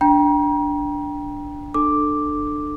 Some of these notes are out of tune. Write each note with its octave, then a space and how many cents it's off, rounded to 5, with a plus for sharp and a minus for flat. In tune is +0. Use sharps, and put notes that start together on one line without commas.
D4 -5 G5 +0 A#5 +40
D4 +25 A4 +5 D6 +0